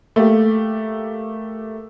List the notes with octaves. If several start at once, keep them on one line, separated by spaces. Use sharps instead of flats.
A3 A#3 G4